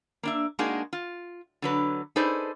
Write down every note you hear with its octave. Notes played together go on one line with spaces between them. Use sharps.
A#3 D4 E5
G#3 A#3 D4 D#4 F#4 G#4
F4
D3 F#3 B4
D#4 G#4 A4 B4 C5 D5